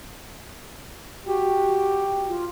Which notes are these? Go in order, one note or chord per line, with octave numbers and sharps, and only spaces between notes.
F#4 G4
F4